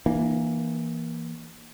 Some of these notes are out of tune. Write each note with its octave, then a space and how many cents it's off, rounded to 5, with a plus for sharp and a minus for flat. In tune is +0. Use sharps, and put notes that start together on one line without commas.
E3 +0 A#3 +10 D4 +45